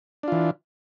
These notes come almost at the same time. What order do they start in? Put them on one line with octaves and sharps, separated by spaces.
D4 F4 E3